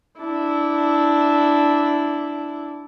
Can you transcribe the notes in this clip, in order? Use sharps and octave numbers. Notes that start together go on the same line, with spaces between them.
D4 E4